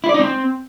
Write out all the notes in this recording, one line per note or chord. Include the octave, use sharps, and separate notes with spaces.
E4
D5
D#4
C4